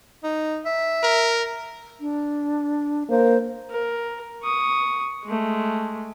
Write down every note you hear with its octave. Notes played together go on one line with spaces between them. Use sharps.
D#4
E5
A#4
D4
A#3 C5
A#4
C#6 D#6
G#3 A3